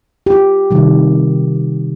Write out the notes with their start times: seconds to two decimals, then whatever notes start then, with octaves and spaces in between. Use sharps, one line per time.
0.26 G4
0.32 F4
0.71 C3 D#3 G3